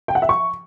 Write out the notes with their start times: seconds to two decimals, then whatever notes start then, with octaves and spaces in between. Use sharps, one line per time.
0.08 G5
0.15 F#5
0.22 E5
0.29 C#6